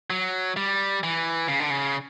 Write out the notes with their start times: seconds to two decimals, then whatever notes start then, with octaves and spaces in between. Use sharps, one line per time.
0.10 F#3
0.57 G3
1.03 E3
1.48 C#3
1.60 D3
1.70 C#3